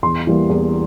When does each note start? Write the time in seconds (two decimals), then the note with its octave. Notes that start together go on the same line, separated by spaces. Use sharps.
0.02 E2 C6
0.27 E3 G3 A#3
0.49 E2